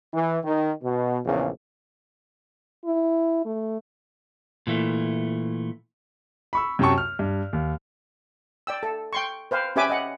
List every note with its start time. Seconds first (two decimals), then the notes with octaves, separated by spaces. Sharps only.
0.13 E3
0.44 D#3
0.83 B2
1.25 A#1 E2 C#3
2.85 E4
3.45 A3
4.67 A#2 E3 A3
6.53 B5 C#6 E6
6.79 F#2 C3 F#3 G5 A5 C#6
6.98 F6
7.19 G2
7.53 D#2
8.67 D5 G5 E6
8.83 A4
9.13 G5 C6 C#6
9.51 B4 C5 F5 G5
9.76 C#4 G4 B4 E5 G#5 D6
9.90 D#5 F#5